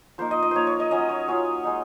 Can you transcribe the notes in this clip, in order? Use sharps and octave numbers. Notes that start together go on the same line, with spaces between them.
F3 A#3 D#4 C5
D#5
D#5
F3 A#3 D#4 C5 C#5
C#5
D#5
F#3 C#4 F4 D#5
C#5
F#3 C#4 F4 C#5
G#3 D#4